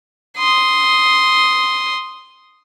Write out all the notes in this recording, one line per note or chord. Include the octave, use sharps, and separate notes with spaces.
C6 D#6